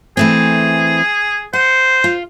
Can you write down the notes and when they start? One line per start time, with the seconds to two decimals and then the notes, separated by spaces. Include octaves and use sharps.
0.17 E3 A3 C4 G#4
1.53 C5 F#5
2.04 F4